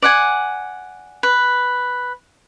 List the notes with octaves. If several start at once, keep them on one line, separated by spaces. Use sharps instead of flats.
D5 F#5 G#5
B4